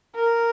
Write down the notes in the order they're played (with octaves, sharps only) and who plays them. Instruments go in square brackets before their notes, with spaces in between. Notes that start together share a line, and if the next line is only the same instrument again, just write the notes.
[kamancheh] A#4